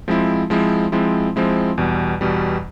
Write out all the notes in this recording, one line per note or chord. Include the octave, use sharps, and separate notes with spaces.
F3 G#3 C4 E4
F3 G#3 C4 E4
F3 G#3 C4 E4
F3 G#3 C4 E4
E2 B2 G3
E2 B2 G3